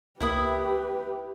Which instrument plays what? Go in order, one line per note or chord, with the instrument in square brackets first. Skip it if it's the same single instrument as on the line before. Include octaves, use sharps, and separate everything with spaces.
[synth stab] C#2 A#3 E5 [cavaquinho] E4 B5 D#6 [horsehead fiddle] G4 B4